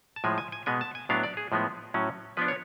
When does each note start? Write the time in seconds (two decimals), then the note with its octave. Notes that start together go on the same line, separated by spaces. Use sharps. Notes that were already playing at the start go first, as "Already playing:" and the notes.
0.16 A5
0.24 A2 F3 G#3 G#5
0.38 G#5
0.52 G#5
0.66 B2 G#3 B3 G#5
0.81 A5
0.95 G#5
1.09 A2 F#3 B3 D4 F5
1.23 D5
1.37 G#4
1.52 A2 F3 G#3 B3
1.94 A2 F#3 C#4
2.37 F3 B3 D4 B4
2.48 C#5